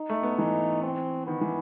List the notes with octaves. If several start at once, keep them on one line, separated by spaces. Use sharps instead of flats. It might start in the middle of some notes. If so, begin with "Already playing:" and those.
Already playing: D#4
A3
B3
E3 D#4
C4
D#3 B3
E3